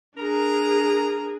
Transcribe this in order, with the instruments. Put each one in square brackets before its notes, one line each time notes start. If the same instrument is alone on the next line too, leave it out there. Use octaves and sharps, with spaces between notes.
[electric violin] D4 G#4 [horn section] A#4 A#5